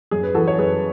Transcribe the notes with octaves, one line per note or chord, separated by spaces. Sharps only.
F#2 G#4
B4
E3 F#4 A4
C#5
F#2 G#4 B4